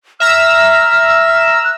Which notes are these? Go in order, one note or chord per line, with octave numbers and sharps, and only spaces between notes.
E5 A#5 E6 F6
F#6